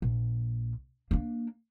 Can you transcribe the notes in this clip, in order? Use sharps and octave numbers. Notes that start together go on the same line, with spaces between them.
A#1
A#3 D4